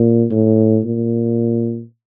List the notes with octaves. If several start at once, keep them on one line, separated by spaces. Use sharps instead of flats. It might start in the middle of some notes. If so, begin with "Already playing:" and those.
Already playing: A#2
A2
A#2